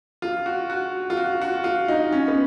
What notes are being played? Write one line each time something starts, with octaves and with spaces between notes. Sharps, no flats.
F4
F#4
F#4
F4
F#4
F#4
F4
D#4
C#4
B3